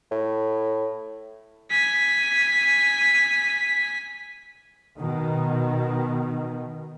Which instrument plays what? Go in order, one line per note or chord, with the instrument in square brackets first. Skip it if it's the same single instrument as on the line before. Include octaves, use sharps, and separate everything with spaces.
[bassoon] A2
[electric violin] G#5 B6
[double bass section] B2 D#3